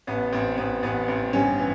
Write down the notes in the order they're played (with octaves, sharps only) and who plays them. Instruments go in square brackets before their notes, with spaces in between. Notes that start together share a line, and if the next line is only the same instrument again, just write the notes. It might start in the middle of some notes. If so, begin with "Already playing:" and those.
[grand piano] A1 B3
A1 C4
A1 B3
A1 B3
A1 C4
G2 C#4
E3